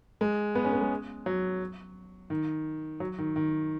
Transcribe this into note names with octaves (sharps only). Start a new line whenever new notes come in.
G#3
B3
C#4
B3
G#3
F#3
D#3
F#3
D#3
D#3